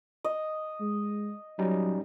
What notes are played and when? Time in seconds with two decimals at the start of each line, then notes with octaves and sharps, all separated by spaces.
0.24 D#5
0.80 G#3
1.59 F#3 G3 C#4 D#4